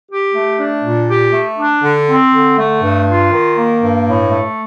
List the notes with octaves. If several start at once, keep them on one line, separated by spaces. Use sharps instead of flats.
G4
A3
D4
A#2
G4
A3
D4
D3
C4
D3
A3
G2
F4
D#3
A#3
G2
A2
A3